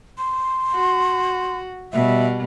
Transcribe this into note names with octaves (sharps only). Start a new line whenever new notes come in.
C6
F#4
B2 G3 E5